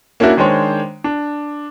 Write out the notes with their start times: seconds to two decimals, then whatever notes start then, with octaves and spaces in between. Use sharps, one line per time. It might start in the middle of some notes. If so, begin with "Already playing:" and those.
0.20 A#3 C#4 D4 E4 F#4
0.37 D#3 G#3 D4 C5 C#5
1.04 D4